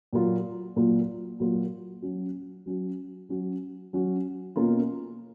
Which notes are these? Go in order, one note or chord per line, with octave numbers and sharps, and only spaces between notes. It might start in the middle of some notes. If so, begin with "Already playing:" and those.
A#2 F#3 A#3 F4
A#2 F#3 A#3 F4
A#2 F#3 A#3 F4
F#3 C#4 F#4
F#3 C#4 F#4
F#3 C#4 F#4
F#3 C#4 F#4
B2 A#3 C#4 F4